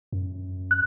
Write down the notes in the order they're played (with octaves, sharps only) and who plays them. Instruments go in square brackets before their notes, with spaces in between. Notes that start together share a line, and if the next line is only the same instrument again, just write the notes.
[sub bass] F#2
[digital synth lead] F#6